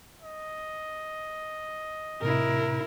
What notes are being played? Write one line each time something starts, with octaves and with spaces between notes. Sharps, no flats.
D#5
A2 C3 E4 A#4